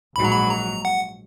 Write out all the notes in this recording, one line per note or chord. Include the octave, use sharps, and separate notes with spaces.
A#1 G#2 F#3 B5
A#5
B5
A#5
F#5